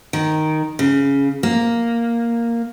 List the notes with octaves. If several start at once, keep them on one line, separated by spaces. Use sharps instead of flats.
D#3
C#3
A#3